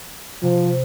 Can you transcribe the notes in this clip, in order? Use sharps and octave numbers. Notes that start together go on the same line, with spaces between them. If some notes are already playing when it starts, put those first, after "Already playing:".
C3 F3